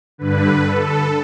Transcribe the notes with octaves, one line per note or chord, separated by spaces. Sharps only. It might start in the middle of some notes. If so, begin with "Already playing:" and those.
G2 D3 B4
A4